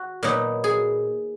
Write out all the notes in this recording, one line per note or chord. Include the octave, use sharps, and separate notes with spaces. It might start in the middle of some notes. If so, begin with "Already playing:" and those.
Already playing: F#4
A#2 F#3 B3 D#4
G#4